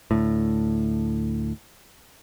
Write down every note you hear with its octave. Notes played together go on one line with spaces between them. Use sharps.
D2 A2